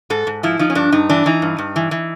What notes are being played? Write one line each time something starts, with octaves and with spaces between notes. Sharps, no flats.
G#2 A4
G#2
F3 E4
F3 D#4
C#4
G2 D4
G2 D#4
E3 D4
E3 D#4
G2
G2
E3
E3